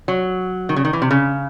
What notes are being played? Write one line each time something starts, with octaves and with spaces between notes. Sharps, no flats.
F#3
D#3
C#3
D#3
E3
C3
C#3